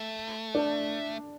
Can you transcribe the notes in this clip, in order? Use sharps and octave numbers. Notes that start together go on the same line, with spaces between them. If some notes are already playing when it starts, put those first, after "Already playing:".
Already playing: A3
D4